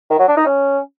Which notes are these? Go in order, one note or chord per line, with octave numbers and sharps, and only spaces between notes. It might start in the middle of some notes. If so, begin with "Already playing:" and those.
D#3
F#3
D4
D#4
C#4